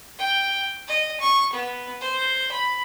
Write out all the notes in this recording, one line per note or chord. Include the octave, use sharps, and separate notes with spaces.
G5
D#5
C#6
B3
C5
B5